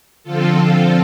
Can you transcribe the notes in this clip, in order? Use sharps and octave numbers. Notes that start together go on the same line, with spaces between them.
D3 F3 C4 F4 A4